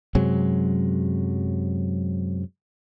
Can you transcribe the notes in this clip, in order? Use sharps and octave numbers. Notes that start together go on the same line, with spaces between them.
F#2 C3 F#3 G#3